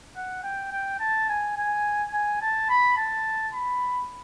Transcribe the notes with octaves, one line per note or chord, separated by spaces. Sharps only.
F#5
G5
G5
A5
G#5
G#5
G#5
A5
B5
A5
B5